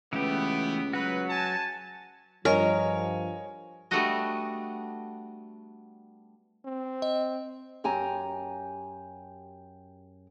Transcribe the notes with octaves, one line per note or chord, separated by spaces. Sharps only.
C#2 E3 A3 B3 G4
F#3 F#4 B4
G#5 A5
G2 F3 A#4 C#5 D#5 G#5
G3 A3 B3 D4 F#4 D#5
C4
D#5
F#2 G4 G#5 A#5